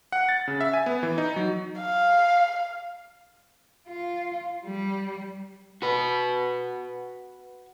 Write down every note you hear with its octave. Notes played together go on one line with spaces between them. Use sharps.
F#5
A6
C#3
E5
G#5
B3
E3
D#4
F#3
F5
F4
G3
F#4 B4